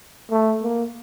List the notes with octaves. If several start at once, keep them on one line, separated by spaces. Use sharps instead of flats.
A3
A#3